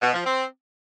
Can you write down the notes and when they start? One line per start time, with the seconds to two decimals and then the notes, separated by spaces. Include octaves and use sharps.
0.02 B2
0.14 F3
0.25 C4